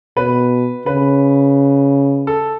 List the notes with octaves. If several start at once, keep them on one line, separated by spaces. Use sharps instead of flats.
B2 B4
C#3 B4
A4